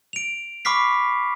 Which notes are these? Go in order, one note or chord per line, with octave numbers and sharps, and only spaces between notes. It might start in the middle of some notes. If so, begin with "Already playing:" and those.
D7 F7
B5 C#6 D6 F6 B6 C7